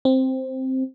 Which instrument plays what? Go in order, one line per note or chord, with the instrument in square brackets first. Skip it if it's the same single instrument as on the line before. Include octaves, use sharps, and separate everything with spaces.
[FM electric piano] C4